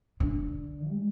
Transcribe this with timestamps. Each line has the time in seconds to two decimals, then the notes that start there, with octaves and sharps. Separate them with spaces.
0.20 D3
0.90 G#3